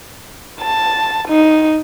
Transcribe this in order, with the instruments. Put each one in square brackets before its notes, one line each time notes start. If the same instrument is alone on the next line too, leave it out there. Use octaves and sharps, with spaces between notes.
[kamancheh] A5
D#4